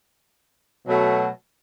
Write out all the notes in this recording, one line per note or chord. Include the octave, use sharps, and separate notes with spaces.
B2 F#3 A3